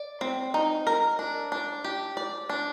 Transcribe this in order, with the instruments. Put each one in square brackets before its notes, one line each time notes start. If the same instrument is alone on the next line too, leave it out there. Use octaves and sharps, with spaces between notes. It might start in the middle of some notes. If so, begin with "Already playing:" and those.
Already playing: [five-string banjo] D5
C4
D#4
A#4
D4
D4
G4
D5
D4